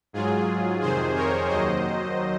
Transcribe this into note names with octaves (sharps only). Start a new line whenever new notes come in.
G#2 F#3 F4 G#4
F2 C3 D#3 G#4 C5
A#4 C#5
D#2 D#3 F#3 C5 D#5